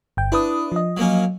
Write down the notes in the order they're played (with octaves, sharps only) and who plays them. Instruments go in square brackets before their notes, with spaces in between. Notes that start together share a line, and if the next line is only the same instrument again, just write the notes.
[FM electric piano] G1 G5
[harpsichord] D4 [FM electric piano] E4 B4 D#6
[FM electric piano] F3 D#5
[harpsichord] F#3 A#3 C#4